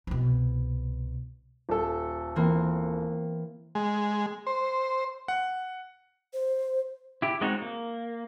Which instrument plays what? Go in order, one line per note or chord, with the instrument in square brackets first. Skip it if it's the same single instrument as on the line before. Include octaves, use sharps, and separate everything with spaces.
[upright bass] C2 B2
[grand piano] D#1 A4
[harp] E3 A#3 C4
[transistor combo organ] G#3
C5
[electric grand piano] F#5
[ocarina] C5
[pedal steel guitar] E4 G4
G#3 C4 D#4 F#4 C#5
A#3